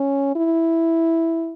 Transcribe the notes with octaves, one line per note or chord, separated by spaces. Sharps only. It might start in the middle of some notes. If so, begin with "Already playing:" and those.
Already playing: C#4
E4